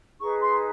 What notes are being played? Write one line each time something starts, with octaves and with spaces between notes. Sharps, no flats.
D#4 G#4 B4 C#6
C6